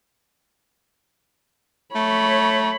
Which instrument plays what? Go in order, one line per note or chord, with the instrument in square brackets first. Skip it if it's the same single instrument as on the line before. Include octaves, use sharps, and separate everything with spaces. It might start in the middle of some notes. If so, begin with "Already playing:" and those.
[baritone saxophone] A3 [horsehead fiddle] C#5 B5